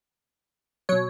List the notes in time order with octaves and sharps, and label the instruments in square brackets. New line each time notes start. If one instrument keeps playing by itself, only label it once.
[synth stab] B2 F#3 C#5